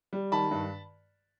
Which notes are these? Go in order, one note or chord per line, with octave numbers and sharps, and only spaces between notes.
G3
D#3 A5 B5
G2